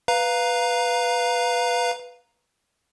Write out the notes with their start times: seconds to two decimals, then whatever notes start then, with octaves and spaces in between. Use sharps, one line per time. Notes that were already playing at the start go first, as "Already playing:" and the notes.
0.08 B4 F5 A#5